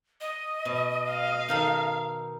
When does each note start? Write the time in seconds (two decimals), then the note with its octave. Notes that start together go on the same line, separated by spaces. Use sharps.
0.21 D#5
0.65 B2
1.09 F5
1.49 D#3 D#4 A4